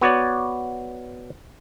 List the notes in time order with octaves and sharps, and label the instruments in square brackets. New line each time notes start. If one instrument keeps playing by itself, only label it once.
[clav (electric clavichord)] B3 F#4 C#5 D5